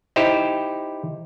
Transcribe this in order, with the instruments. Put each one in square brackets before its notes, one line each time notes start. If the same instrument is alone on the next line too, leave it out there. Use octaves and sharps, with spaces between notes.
[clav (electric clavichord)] D#4 E4 G4 C5